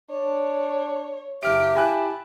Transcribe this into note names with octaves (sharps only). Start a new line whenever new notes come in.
D4 C#5
F#1 G4 E5 F6 D7
E4 G4 G#5 A5 F#6